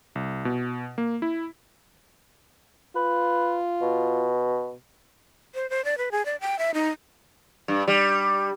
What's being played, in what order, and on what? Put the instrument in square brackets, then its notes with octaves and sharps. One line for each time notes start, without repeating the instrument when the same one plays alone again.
[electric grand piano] C2
B2
A#3
E4
[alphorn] F4 [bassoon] B4
[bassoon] B2
[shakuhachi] C5
C5
D5
B4
G#4
D5
G5
E5
D#4
[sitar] G2
G3